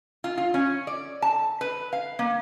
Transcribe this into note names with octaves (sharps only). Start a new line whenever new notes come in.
F4
F4
C#4
D5
A5
B4
F5
A#3